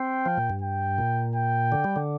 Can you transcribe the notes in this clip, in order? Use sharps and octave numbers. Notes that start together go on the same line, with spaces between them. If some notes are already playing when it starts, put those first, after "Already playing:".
Already playing: C4 G5
F3
A#2
G2
G5
A#2
G5
D3
G3
D3